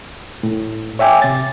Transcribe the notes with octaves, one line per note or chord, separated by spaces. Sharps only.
A2
C#5 E5 G5 G#5 D6
C3 A6